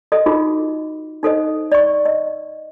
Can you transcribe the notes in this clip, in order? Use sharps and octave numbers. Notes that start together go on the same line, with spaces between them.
A4 D#5
D#4 F4 F#4 G#4 A4
D#4 A4 C5 D#5
D5 C#6
D#5